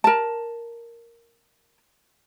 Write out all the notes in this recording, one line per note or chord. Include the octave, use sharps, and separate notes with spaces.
A#4 A5